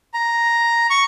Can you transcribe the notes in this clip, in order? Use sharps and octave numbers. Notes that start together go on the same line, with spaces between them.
A#5
C#6